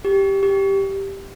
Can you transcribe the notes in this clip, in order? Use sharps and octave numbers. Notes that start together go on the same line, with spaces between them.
G4
G4